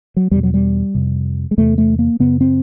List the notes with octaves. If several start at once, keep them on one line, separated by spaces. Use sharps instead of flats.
F#3
E2 B2 G3
F#3
G3
F2 C3
G#3
E2 C3 A3
A3
A#3
F#2 C#3 B3
C4